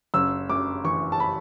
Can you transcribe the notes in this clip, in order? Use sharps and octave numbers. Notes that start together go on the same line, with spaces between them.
F#1 E6
F#2 D6
E3 C#6
A5
B5